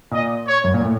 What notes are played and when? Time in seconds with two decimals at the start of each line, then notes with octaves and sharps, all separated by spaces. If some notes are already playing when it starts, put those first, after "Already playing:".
0.11 A#2 D#5
0.47 C#5
0.64 F#2
0.74 A#2
0.82 A2